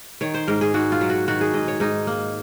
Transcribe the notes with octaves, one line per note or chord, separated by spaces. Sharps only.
D#3 C#5
C5
G#2 A#4
G#4
G#2 F#4
F4
F#3
F#4
D#3 F#4
G#4
G#2 D#5
C#5
G#2 D#4
A#3